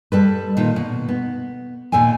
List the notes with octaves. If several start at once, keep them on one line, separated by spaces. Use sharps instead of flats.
G3 A4 B4
A#2 D#3 F4
B2
B3
D#2 A#2 A4 G5 G#5